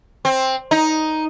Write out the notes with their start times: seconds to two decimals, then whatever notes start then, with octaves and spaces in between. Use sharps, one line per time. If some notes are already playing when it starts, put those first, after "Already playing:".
0.25 C4
0.71 D#4